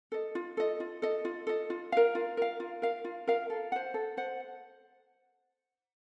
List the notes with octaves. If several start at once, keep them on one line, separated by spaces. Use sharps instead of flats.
A4 D#5
F4
A4 D#5
F4
A4 D#5
F4
A4 D#5
F4
A#4 F5
F4
A#4 F5
F4
A#4 F5
F4
A#4 F5
A4
C5 F#5
A4
C5 F#5